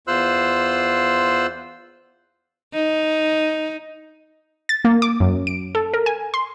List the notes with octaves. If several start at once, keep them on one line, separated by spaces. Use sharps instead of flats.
E2 F4 C5 C6 E6 F#6
D#4
A6
A#3
D6
F#2
D7
A4
A#4
G#5
C6